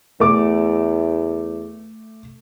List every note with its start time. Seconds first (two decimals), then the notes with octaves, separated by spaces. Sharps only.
0.20 E2 A3 D6